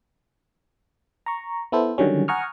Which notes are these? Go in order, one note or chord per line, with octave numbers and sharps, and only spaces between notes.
A#5 C#6
B3 E4 A4 C5
D3 D#3 F#3 G3 C#4
F#5 G#5 A#5 C#6 D#6 F6